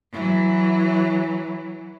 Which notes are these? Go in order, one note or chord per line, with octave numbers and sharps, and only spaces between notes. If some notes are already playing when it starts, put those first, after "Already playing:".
E3 F#3